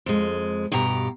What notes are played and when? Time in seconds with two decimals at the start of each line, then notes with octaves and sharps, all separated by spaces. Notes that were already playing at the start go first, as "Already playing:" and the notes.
0.06 F2 G#3
0.72 G2 B2 G4 A#5